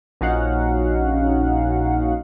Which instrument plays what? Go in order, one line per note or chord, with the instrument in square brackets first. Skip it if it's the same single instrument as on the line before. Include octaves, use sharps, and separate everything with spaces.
[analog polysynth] A#1 C#4 D#4 F#4 F5 F#5